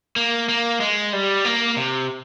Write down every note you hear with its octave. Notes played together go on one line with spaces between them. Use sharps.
A#3
A#3
G#3
G3
A#3
C3